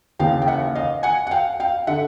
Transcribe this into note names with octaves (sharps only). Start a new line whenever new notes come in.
D#2 C#3 E3 F5 G5
G5
E5 F#5
D#5 F5
F#5 G#5
F#5
F5 G5
F5 G5
D3 E5 F#5